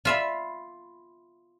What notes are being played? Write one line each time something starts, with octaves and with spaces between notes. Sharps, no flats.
F4 E5 B5